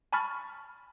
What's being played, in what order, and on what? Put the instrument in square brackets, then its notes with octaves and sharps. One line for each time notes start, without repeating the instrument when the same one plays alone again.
[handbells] G#5 A5 B5 C#6 F6 A6